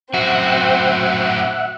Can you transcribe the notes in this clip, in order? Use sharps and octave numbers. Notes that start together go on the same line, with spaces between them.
F#2 A2 C4 F#4 E5 F#5